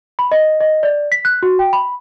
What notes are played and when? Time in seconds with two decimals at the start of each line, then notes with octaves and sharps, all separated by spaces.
0.19 B5
0.32 D#5
0.61 D#5
0.83 D5
1.12 B6
1.25 F#6
1.43 F#4
1.59 G5
1.73 B5